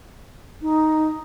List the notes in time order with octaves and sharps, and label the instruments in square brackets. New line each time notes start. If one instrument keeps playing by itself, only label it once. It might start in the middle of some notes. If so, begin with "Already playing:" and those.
[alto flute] D#4